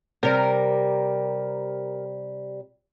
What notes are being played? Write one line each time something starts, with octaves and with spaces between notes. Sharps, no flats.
C3 G3 A#4